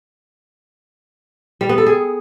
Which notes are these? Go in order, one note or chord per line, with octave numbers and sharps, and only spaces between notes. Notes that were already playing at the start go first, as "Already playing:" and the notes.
G3
B3
A4
G#4